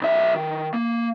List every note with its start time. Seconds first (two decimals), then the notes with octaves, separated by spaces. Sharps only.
0.01 B1 E5
0.36 D#3
0.74 A#3